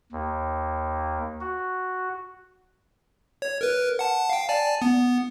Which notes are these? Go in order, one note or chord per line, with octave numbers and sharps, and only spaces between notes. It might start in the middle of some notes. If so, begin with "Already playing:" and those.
D#2
F#4
C#5
A#4 B4
F#5 A5
F5 G5
D5 G#5 A5
B3